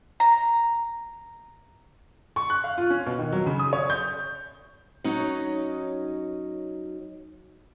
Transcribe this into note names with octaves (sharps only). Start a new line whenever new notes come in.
A#5
C#6
F#6
F5
F4
C#4
B2
D#3
F#3
C#3
D#6
C#5
G6
F#3 C#4 D#4